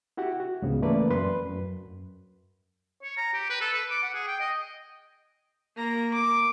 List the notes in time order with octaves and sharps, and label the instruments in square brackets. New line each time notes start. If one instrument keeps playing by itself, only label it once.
[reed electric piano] E4 F#4 G4 F#5
F#4
C#2 G#2 C#3 B3
E3 A3 A#3 C#4 B4 D5
F#2 B4 C6
F#2
[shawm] C#5
A#5
G4
B4
A4
B4
D6
F#5
G#4
G5
D#5
[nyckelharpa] A#3 A#5
D6